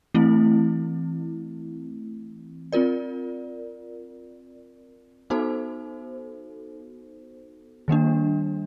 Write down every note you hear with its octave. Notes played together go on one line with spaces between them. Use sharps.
E3 A3 C4 E4
C4 F4 A#4 D5
B3 D#4 F#4 A4 C5
D#3 G3 A#3 D4